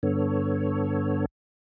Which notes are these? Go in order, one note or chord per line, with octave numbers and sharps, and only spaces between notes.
G2 D3 B3 A4 C#5